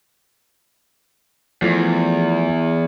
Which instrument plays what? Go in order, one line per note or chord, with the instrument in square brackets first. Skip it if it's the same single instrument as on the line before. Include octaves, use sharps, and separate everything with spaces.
[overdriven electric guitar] E2 [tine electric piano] F3 A3